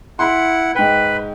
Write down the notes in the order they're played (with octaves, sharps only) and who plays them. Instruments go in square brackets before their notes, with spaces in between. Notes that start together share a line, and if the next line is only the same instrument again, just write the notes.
[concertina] E4 F#5 [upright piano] B5 C6
[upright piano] G#2 G5 [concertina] B4